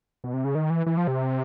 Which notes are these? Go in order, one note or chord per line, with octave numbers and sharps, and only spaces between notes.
B2
C3
C#3
D#3
E3
E3
F3
C3